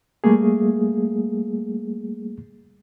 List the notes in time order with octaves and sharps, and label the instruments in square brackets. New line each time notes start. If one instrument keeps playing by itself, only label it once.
[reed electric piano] G3 A3 A#3 G#4